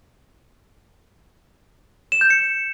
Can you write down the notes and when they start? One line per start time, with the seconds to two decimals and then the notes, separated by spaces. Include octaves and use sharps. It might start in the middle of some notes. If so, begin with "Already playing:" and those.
2.12 E7
2.21 G6
2.30 C#7